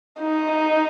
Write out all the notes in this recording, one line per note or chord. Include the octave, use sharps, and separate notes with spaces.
D#4